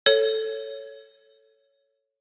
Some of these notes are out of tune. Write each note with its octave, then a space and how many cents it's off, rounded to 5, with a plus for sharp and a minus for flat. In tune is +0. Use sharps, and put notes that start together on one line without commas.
A4 +0 C#5 +0